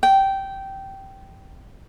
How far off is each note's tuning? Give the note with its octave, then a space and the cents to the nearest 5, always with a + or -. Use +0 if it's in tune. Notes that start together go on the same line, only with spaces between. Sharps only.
G5 -15